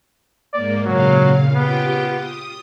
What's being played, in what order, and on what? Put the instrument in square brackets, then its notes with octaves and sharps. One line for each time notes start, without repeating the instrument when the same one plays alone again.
[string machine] G#2 A#3 [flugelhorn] D5
[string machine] A#2 C#3 F5 [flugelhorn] F#3
[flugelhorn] B3 [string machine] F4 G4 G5
[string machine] D#6